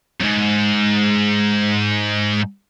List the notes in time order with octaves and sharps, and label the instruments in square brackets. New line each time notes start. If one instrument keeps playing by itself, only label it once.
[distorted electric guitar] F2 G#2